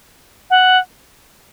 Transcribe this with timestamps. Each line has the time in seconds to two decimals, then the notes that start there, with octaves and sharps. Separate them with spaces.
0.50 F#5